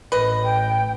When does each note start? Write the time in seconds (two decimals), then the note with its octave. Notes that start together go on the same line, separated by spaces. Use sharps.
0.12 A1 B4 D#5
0.42 G5